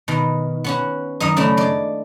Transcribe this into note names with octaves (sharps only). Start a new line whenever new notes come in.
B2 D#3
B3 C#4 F#4
F#2 D#3 D#4 D#5
C#3 A3 C#4 D4 E4
G#3 D5